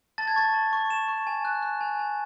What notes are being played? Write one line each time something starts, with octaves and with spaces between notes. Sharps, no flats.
A5 A6
G#6
C#6 A6
A5
C#6
C#6 E7
C#6
G#5
F#6
F#6
G#5
G#5